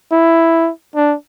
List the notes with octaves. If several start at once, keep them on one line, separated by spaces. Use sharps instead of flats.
E4
D4